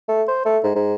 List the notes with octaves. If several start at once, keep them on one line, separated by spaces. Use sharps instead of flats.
A3
C5
A3
G#2
G#2